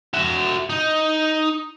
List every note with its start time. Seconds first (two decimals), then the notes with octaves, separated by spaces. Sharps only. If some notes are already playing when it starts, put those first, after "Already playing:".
0.14 F#4 E5
0.70 D#4